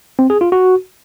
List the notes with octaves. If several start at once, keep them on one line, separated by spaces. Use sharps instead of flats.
C4
G#4
F4
F#4